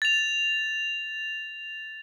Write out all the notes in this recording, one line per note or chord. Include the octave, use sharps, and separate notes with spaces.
A6 F7